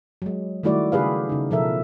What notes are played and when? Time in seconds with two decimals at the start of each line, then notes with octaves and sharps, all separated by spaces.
0.22 F#3 G#3
0.63 D#3 G3 A3 E4 F#4 D5
0.92 C#3 G4 G#4 B4 F5
1.29 C#3 D#4
1.51 B2 F3 A4 A#4 E5